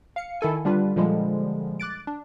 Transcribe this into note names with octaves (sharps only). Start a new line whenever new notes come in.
F5 C#7
D#3 E4 A4 G#5
D3 G3 D4 F4 B4
A#2 D3 F3 G3 G#3
D6 F#6 A6 D7
D4